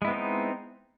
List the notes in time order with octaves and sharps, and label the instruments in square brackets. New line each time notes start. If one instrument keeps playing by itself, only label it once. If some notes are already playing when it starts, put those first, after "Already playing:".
[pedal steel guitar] G#3
E4
B3
C4
D#4